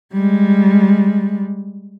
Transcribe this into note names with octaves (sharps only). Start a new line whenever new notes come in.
G3 G#3